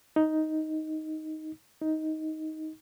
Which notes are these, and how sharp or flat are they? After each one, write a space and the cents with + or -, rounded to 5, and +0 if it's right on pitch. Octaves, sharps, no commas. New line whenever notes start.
D#4 +5
D#4 +10